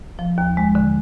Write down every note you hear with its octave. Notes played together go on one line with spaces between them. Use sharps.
F3
D#2
G#3
D3